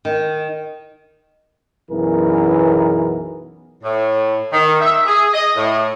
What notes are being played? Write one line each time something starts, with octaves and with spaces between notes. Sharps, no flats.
D#3
B1 F#2 E3 B3 G#4 A#4
A2
D#3
E5
G#4
D#5
A2